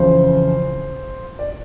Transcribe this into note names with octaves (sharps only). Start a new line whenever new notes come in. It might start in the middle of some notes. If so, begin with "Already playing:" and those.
Already playing: F2 C#3 E3 C5
D5